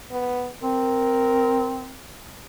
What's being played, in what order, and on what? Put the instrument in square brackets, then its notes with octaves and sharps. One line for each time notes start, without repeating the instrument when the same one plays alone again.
[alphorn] B3
[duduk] C4 [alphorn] A#4